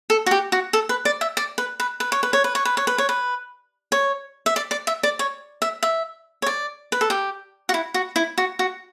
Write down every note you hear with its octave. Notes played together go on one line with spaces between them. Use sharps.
A4
F#4
G4
F#4
A4
B4
D5
E5
D5
B4
B4
B4
C#5
B4
C#5
B4
C#5
B4
C#5
B4
C#5
B4
C#5
E5
D5
D5
E5
D5
C#5
E5
E5
C#5
D5
B4
A4
G4
F#4
E4
F#4
E4
F#4
F#4